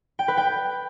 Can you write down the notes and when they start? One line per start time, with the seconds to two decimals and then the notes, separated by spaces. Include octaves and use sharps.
0.19 G5
0.28 B4
0.37 G5